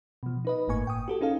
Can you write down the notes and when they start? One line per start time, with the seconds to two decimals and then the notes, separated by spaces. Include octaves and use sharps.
0.23 B2 F3
0.45 D#4 B4 D#5
0.68 G1 A2 A#3 G#5 C#6
0.87 G5 D#6
1.08 F#4 G4 A4
1.21 C#4 D#4 G#4 A4 F5